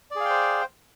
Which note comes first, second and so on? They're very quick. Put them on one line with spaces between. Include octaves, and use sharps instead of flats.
D5 G#4 F5 G5 C5